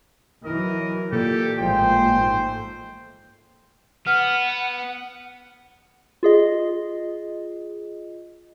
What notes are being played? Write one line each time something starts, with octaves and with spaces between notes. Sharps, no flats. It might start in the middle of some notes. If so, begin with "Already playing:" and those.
E3 F#3 A#4 D#5
A#2 G4 A4
A1 F3 G#3 C5 G5
G#2 A3
B3 F#5 F6
F4 G#4 D#5